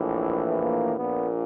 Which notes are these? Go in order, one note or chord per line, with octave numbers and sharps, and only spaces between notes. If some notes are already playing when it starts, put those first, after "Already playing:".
Already playing: A#1 A2 E3
A#3
A#1 A#2 B3